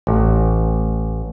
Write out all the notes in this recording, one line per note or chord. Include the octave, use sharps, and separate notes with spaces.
A1